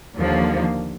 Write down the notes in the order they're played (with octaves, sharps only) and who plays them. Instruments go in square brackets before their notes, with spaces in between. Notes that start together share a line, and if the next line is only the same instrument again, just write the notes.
[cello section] D#2 D3 F3 A#3